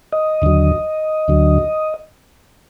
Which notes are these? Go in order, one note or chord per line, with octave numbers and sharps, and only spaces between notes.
D#5
D#2 D3 F#3
D2 D3 F#3